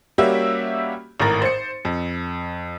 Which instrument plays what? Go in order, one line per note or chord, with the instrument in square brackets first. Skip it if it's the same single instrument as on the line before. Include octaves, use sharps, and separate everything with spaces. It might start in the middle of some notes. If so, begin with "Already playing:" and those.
[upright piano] G3 A#3 C#4 F#4 G4 E5
G#1 A2 A#4 A#5 A6
C5 C#7
F2